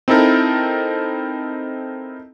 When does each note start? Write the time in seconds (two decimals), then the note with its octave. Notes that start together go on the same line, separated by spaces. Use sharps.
0.08 C4 D#4 E4 A4 A#4